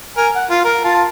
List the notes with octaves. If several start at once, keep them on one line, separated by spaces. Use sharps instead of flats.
A#4 G#5
F#5
F4
A#4
F4 A5